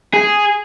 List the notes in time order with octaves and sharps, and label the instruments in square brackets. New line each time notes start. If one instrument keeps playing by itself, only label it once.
[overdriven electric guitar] G#4